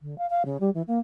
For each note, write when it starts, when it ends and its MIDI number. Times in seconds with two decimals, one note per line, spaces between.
0.02 0.18 50
0.18 0.27 77
0.30 0.43 77
0.45 0.58 49
0.60 0.70 55
0.74 0.82 52
0.88 0.99 58